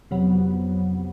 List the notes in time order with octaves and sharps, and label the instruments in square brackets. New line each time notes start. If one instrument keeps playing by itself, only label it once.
[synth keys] F2 C3 F#3 B3